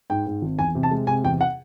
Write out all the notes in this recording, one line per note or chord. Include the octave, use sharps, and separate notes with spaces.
G#2 G5
G#2
G#1
E2 G#5
C3
A5
G#3
C3 G#5
E2 G5
F#5